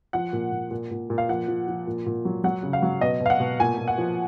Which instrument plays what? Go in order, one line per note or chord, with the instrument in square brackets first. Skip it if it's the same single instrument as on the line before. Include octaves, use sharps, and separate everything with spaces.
[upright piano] F3 F#5
A#2
A#2
A#2
A#2
A#2
F5
F3 F#5
F3
F3
A#2
A#2
F#3
F#3 F#5
C#3
F5
F#3
B2 D#5
B2
F5
F#5
B2
A#2 G#5
A#2
F#5
F3